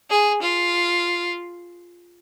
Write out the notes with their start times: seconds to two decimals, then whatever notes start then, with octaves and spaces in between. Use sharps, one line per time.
0.10 G#4
0.42 F4